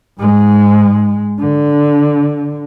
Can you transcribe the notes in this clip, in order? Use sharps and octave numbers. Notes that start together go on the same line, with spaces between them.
G#2 G#3
D3